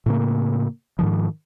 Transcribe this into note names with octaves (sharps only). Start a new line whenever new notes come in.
A2 C#3 A#3
G#2 D#3 F3